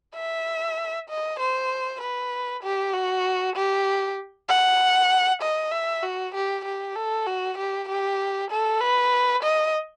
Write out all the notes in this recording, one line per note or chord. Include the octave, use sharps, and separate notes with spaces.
E5
D#5
C5
B4
G4
F#4
G4
F#5
D#5
E5
F#4
G4
G4
A4
F#4
G4
G4
A4
B4
D#5